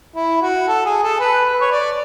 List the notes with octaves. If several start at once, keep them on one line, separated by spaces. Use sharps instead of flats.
E4
F#4
A4
G#4
A4
B4
B4
C#5
D5